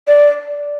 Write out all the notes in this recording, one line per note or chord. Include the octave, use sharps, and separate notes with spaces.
D5